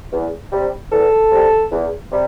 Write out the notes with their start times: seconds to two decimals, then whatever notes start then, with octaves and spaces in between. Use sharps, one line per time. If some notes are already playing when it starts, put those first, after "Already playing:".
0.12 E2
0.52 C3 G3
0.92 E2 A4
1.32 C3 G3
1.72 E2
2.12 C3 G3